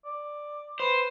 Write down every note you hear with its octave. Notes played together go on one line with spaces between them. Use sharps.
D5
B4 C5